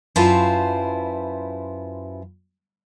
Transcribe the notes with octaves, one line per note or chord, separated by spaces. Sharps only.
F#2 E4 F4 B4 C5 A5